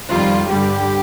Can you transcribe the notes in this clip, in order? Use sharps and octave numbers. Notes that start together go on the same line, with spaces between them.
F2 D#3 G3 F4
G2 D3 G3 G4